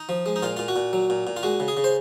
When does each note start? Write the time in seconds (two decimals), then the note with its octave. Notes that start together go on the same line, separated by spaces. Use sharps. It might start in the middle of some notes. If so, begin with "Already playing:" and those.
Already playing: D#4
0.09 F3
0.26 G#3
0.36 D#4
0.43 A#2 F4
0.57 A#2 F4
0.68 F#4
0.76 A#2
0.93 F#3
1.10 A#2
1.27 A#2
1.36 F4
1.43 G#3 F#4
1.60 C#3
1.68 G#4
1.77 C#3
1.84 C5